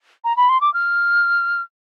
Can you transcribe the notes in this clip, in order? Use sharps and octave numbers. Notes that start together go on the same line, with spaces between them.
A#5
B5
C6
D6
F6